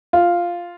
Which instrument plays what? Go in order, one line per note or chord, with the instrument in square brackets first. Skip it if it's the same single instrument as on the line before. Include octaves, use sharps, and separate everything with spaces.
[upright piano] F4